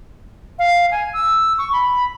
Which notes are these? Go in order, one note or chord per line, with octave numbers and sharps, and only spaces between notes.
F5
G#5
E6
C#6
B5